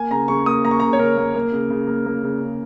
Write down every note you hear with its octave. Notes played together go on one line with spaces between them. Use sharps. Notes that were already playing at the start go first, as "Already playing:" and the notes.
Already playing: A#3 G#5
C#3 A#5
C#3 C#6
A#3 D#6
A#3 A#5
C#6
C#3 A#5
C#5
C#3 A#4
A#3
A#3
C#3
C#3
A#3
A#3
C#3
C#3